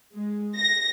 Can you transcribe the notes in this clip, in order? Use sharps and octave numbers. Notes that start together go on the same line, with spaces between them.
G#3
A#6